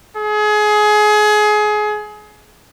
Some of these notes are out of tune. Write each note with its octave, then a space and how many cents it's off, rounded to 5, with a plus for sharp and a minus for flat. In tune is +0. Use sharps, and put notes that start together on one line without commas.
G#4 +25